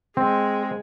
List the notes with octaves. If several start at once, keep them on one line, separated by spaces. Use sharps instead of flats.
G#3 C4